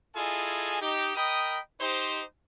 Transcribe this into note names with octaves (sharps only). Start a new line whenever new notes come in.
E4 F4 G#4 A4 D#5 G#5
D#4 G4
A#4 D#5 G5 B5 D#6
D#4 G4 C5